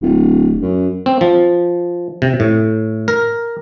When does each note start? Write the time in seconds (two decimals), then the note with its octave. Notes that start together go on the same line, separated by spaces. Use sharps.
0.02 D1
0.62 F#2
1.06 C4
1.21 F3
2.22 C3
2.40 A2
3.08 A#4